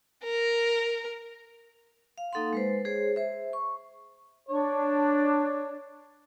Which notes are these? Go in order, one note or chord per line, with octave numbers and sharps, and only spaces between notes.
A#4
F5
A#3 D#4 A4 F5 F#5 C6
G#3 B4 C5
G#4 C5 C#5
C5 E5
C#6
D4 C#5